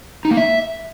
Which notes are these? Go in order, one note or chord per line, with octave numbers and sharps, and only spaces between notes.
D#4
A#3
E5